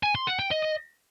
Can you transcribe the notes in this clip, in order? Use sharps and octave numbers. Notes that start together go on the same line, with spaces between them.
G#5
C6
F#5
G5
D#5